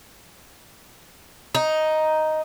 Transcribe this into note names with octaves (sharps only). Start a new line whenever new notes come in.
D#4